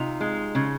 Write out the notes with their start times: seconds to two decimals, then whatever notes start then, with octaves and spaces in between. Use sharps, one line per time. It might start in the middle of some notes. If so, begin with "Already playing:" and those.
Already playing: C3 D#4 F4
0.21 G#3
0.55 C#3